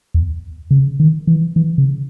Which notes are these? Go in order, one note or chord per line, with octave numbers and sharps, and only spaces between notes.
E2
C#3
D#3
E3
E3
C#3